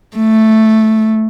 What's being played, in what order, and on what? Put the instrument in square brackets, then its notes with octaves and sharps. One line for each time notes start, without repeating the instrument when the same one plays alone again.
[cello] A3